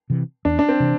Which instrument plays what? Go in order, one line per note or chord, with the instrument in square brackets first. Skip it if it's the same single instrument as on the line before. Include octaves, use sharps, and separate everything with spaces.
[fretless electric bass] C3 E3
[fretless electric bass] E2 [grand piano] D4
[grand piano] D4
C4
[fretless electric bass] C3 E3